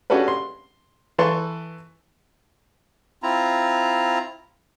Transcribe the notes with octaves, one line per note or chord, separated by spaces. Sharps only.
C#4 D4 F#4 G4 A4 B4
C6
E3 A4 B4 A5 C6 C#6
C4 E4 F4 A#5